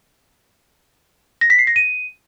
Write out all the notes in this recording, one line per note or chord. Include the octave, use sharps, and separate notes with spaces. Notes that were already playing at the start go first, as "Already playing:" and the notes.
A#6
B6
C7
A#6
D#7